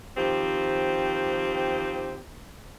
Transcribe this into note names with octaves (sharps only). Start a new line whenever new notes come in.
D#3 F3 C4 G4